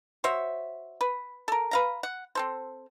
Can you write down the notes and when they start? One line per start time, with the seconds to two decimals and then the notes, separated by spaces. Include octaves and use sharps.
0.24 F#4 C5 C#5 E5
1.01 B4
1.48 A4 A#4
1.71 B4 F5 A#5
2.03 F#5
2.35 C4 A4 C5